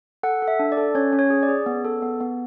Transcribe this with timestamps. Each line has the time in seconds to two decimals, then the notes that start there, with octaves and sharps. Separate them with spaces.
0.23 A4 F#5
0.42 A4
0.48 E5
0.59 D4
0.72 D5
0.77 A4
0.95 C#4 C#5
1.13 C#4
1.19 C#5
1.30 G#4
1.43 D5
1.49 G#4
1.66 B3
1.85 A4
2.02 B3
2.20 B3